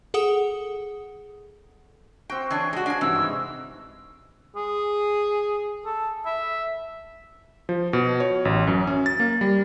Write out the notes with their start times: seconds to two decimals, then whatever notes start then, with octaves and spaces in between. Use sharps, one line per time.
0.14 G#4 A4 F#5 D#6
2.30 C4 F#4 G5
2.51 E3 D4 G#4 C#5
2.73 G#3 F#4
2.86 D4 F5 G#5
3.01 G2 C3 D#3 E3 E6
3.15 G#2
4.56 G#4
5.85 A4
6.26 E5
7.69 F3
7.93 B2
8.20 C#5
8.45 A1
8.67 F#2
8.87 C#4
9.06 A6
9.20 A#3
9.41 G3